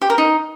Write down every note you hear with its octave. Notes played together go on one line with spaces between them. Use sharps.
G4
A#4
D#4